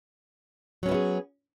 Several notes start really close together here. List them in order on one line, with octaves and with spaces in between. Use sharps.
F#3 C#4 B3 E4 G#4